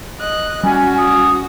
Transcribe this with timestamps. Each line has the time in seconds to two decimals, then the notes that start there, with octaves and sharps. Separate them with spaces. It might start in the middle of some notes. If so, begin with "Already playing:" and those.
0.19 D#5 F#6
0.63 G3 C#4 F#4 G#5
0.98 D#6